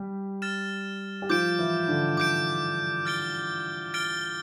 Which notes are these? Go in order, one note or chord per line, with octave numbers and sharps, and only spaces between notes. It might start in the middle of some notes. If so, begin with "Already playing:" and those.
Already playing: G3 G4
F6 A6 E7
G4
F3 F4 D6 G6 D7
E3 E4
D3 D4
D3 D4 D6 G6 D7
F6 A6 D7 G7
F6 A6 D7 G7